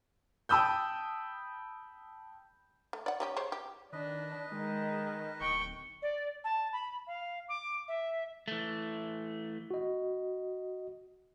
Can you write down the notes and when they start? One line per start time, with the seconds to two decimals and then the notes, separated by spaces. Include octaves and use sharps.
0.49 G5 A5 B5 D#6 E6 G6
2.93 A3
3.06 D5 F#5
3.20 G3 C#4 G4
3.36 G#3 C5 C#5
3.52 G4
3.93 D#3 D4 B4 D#5
4.52 D#3 G#3
5.41 D1 G5 C#6
6.02 D5
6.44 A5
6.73 B5
7.07 F5
7.49 D6
7.88 E5
8.48 E3 A3
9.71 F#4 D#5